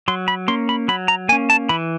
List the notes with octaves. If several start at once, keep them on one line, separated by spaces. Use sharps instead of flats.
F#3 C6
B5
A#3 C#4 C6
B5
F#3 B5
A#5
A#3 C#4 G#5
A5
E3 B5